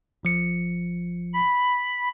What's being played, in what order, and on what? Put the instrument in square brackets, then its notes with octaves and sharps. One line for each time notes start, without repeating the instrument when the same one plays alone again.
[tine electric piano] G1 F3 C#7
[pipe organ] B5